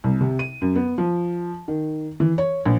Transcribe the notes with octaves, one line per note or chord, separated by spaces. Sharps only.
C2
C3
D#7
F#2
B3
F3
D#3
E3
C#5
A#1